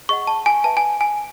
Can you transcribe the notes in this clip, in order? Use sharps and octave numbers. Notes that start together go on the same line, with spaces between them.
G#4 D#5 F#5 C#6
A5
G#5
B4 E5 A5
G#5
G#5